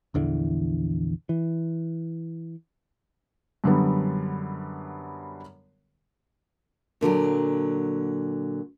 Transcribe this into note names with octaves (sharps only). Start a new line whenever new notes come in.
A#1 E2 D3 E3
E3
F#2 D3 G3 B3
A#2 D3 F3 F#3